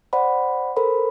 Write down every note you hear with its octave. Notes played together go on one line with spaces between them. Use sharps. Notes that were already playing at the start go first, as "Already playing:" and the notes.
C5 D5 F#5 B5
A4 A#4 C5 B5